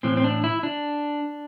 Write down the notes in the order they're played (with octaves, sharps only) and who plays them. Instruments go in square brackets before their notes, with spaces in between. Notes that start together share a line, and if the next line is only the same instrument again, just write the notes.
[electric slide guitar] A2 E3 C4
C4
D4
E4
D4